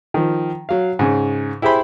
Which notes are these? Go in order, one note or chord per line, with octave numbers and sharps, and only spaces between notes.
D#3 F3
F#3 F5
G#2 C#3
E4 G4 G#4 C5 B5